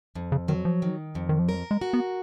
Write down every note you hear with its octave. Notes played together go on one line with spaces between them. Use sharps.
F2
C#3
D#3 F#3
F3
D#3
F2
D#3
F3
F#3 A#4
G#3
F#4
B3